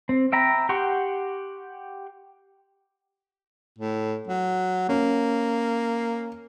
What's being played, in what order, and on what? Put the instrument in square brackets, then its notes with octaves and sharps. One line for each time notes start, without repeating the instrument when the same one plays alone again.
[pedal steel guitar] C4
E5 G5 A#5 B5
G4 F#5 G5 C6 C#6
[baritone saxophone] A2
F#3
[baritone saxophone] A#3 [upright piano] C#4